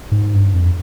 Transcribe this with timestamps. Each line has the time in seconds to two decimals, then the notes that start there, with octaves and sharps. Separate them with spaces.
0.12 G#2
0.34 G2
0.54 F2